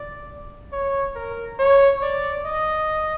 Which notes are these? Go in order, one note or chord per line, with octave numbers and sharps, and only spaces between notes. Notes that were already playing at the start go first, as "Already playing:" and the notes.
Already playing: D5
C#5
A#4
C#5
D5
D#5